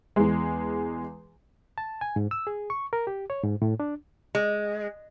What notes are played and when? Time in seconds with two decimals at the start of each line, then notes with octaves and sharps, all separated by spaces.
0.16 E2 G#3
1.78 A5
2.01 G#5
2.16 G#2
2.31 E6
2.47 G#4
2.70 C#6
2.93 A#4
3.07 G4
3.30 C#5
3.44 G#2
3.62 A2
3.80 D4
4.35 G#3